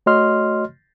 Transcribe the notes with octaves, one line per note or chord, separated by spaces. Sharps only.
A3 F#4 C#5 D#5 C6 F6